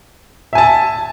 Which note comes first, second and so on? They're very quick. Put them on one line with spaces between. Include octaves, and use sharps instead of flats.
E5 G#5 A5